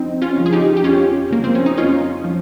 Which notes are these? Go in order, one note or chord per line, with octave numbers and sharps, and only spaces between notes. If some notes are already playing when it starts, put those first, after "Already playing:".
Already playing: F2 C4 D#4
C#4 F4
C#3 F3
G#4
D#4 G4
G4
F2 C#4 F4
C#3 F3 A#3
C4
C#4
D#4
F2 C#4 F4
F3